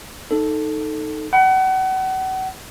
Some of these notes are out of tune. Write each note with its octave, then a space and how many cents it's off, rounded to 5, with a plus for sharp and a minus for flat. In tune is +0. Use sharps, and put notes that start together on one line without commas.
D#4 +0 A4 +0
F#5 +35 B5 -10